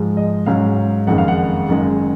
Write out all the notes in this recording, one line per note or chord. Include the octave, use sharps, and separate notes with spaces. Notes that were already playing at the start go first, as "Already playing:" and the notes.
Already playing: G#2 F3 G#3
D#5
G#2 F#3 C#4 F5
F#1 F2 D#3 G#3 F#5
F5
F#5
F#1 F#2 D#3 G#3